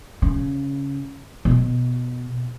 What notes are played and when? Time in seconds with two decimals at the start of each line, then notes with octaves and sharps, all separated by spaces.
0.22 C#3
1.45 B2